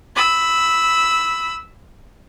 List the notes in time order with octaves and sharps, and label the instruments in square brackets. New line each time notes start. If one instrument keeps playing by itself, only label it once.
[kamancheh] B5 E6